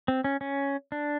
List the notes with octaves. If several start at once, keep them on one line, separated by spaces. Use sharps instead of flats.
C4
C#4
C#4
D4